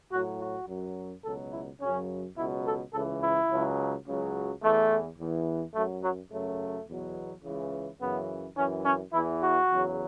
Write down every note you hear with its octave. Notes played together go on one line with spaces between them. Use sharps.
A2 F#3 F#4
F#4
F#2 F#3
C#2 B2 F#3 A4
E4
F#2 C#3 F#3 C#4
C#2 B2 F#3 E4
A4
C#2 C#3 E3 A4
E4
C#2 C#3 F#3
C#2 C#3 F#3
E2 E3 A3
E2 E3
F#2 F#3 A3
F#3
F#2 C#3 F#3 A3
E2 B2 F#3
C#2 C#3 E3
F#2 C#3 E3 B3
F#2 E3 C#4
C#4
E2 E3 E4
F#4
E2 C#3 F#3